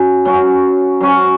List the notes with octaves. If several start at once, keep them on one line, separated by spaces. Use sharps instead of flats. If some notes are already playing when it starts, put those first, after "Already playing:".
Already playing: C#4 F#4
F#3 C#4 F#4
F#3 C#4 F#4